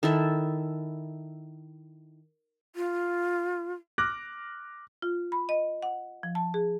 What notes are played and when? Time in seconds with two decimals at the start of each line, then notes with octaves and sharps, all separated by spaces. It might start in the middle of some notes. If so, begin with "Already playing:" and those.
0.03 D#3 E4 A4 E5
2.76 F4
3.98 D6 F6 F#6 A#6
5.02 F4
5.32 B5
5.49 D#5
5.83 F#5
6.23 F3
6.35 A5
6.54 G#4